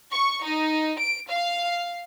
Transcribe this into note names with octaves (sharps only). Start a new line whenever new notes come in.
C#6
D#4
D7
F5